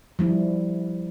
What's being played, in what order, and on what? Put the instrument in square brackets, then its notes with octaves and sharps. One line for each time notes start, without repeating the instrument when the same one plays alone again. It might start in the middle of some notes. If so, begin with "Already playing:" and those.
[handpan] F3 G3 E4